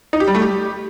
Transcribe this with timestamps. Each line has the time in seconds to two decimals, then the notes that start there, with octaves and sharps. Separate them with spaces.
0.13 D#4
0.20 G4
0.27 G3
0.35 A3
0.42 G4